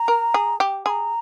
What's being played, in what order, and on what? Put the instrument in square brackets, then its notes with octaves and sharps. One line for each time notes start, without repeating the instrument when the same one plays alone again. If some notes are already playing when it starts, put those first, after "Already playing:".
Already playing: [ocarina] A#5
[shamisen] A#4
G#4
G4
[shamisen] G#4 [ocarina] C6
[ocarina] A#5